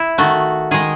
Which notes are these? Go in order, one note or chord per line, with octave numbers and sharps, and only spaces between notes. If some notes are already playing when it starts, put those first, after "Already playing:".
Already playing: E4
D#3 A3 F#4
D#3 G#3 G#4